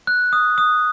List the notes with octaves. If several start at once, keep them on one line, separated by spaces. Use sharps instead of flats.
F#6
D#6
D#6